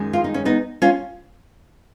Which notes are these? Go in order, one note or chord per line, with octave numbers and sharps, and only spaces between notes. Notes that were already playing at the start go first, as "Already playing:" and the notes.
Already playing: F#2 D#3 G#3
F4
D#4
C#4
B3 D#4
C#4 F4